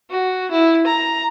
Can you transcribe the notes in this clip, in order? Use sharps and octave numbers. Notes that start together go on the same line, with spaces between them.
F#4
E4
A#5